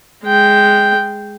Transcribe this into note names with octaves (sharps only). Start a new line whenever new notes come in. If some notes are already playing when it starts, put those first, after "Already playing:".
G#3 G5